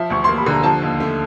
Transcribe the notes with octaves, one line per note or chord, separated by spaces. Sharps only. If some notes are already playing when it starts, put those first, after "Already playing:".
Already playing: F3 E5
D2 C#6
A#3 C6
B5
D3 A#5
F3 A5
D#2
A3